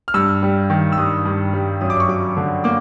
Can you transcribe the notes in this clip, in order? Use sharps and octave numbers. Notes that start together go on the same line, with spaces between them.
F6
G2 E6
G3
D#3
E6
G2 D#6
G2
G3
F#2 D#6
D6
C#6
F#3 D6
D3
A#3 D6